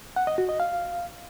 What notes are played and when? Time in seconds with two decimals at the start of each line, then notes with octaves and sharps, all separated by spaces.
0.16 F#5
0.27 D#5
0.38 F#4
0.49 D#5
0.60 F5